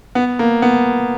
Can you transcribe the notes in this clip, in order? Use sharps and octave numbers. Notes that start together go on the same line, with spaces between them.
B3
A#3
B3